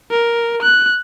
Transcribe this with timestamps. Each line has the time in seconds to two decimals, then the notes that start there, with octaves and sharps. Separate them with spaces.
0.11 A#4
0.62 F#6